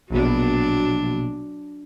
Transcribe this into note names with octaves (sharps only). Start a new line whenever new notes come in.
A#1 B2 F#3 D4